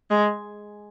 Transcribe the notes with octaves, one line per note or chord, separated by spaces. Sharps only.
G#3